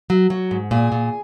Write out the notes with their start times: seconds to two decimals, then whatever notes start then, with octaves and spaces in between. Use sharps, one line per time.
0.10 F#3
0.30 F#3
0.51 G#2
0.71 A#2 G#4
0.92 A#2